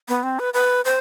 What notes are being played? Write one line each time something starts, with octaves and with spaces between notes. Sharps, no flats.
B3
C4
B4
B4
C5